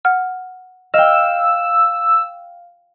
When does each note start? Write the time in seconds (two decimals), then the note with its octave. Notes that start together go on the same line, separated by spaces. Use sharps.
0.05 F#5 F6
0.94 D#5 F5 G5 E6